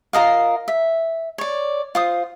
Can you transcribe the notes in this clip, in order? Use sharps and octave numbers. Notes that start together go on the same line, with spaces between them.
F4 A#4 D#5 F5
E5
C#5 D5
F4 C5 D#6